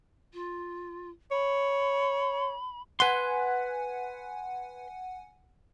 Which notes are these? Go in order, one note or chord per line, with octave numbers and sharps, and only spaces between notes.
F4
C#5 B5
B4 F#5 G#5 C6